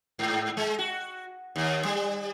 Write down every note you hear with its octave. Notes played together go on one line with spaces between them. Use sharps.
G#2
G#3
F#4
D#2
G3